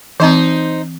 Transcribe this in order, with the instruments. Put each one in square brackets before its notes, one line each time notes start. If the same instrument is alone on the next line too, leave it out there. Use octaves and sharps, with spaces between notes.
[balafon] E3 C4 [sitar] D#4 C5